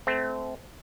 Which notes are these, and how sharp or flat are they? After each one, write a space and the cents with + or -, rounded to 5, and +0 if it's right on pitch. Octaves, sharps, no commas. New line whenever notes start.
A3 -25 C4 -20